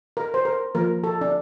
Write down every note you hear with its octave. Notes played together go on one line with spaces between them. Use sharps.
A#4
C5
A#4
F3 A#3 A#4
A4
D4